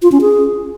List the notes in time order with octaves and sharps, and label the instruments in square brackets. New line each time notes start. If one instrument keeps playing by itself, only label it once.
[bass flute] F4
C#4
G#4